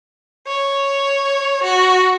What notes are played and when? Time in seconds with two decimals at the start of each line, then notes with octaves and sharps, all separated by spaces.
0.47 C#5
1.63 F#4